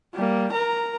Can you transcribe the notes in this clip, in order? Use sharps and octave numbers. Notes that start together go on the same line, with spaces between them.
G3 A#3
A#4 A#5